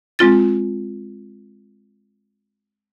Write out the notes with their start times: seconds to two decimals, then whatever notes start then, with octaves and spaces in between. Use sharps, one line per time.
0.19 G#3 C4 F4 A6